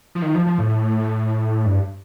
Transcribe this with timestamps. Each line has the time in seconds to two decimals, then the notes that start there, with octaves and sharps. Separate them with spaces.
0.15 F3
0.22 D#3
0.35 F3
0.46 F3
0.58 A2
1.66 G2